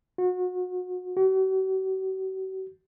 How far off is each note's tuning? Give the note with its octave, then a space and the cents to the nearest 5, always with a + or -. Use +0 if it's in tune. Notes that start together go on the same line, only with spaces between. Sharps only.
F#4 -30
F#4 +45